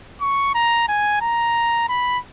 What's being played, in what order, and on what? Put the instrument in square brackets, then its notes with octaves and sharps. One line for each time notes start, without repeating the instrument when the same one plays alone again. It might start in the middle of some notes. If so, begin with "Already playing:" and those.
[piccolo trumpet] C#6
A#5
G#5
A#5
B5